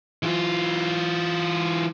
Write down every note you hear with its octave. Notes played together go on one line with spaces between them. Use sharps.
E3 F4